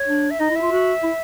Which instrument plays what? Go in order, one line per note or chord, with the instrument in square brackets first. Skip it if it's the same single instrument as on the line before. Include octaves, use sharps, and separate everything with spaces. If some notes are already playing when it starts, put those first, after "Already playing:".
Already playing: [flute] C#5
[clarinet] D4
[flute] E5
[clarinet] D#4 [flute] D#5
[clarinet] E4
[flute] E5
[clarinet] F4
F#4
E4